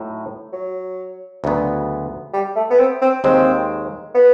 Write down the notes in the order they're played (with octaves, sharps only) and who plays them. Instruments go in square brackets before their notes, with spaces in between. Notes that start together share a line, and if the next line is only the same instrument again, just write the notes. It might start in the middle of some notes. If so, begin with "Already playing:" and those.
Already playing: [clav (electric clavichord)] A2 F#3 D#4
[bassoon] F#3
[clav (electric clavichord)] D2 C#3 F#3 B3
[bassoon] G3
A3
B3
C4
C4
[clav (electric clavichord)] D#2 D#3 G#3 [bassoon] C4
[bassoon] B3